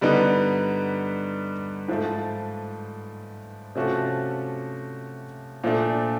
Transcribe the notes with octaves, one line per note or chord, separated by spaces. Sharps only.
G2 D3 G3 B3 D#4
G#2 F3 A3
C3 F3 A3 C#4 F#4
A#2 F3 A3 D4